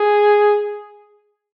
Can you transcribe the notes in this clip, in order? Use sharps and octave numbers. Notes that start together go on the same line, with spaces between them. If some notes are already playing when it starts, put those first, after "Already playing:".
Already playing: G#4